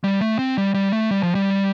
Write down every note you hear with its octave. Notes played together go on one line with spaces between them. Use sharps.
G3
A3
C4
G3
G3
A3
G3
F3
G3